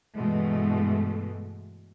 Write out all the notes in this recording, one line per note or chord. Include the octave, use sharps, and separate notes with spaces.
G2 B2 E3 G#3 A3